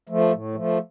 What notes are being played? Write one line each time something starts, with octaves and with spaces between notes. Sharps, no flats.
F3 A3
A2
F3 A3